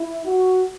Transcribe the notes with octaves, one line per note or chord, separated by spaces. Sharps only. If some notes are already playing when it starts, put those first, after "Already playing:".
Already playing: E4
F#4